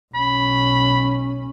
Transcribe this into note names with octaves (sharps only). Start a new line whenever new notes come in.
B1 C#4 B5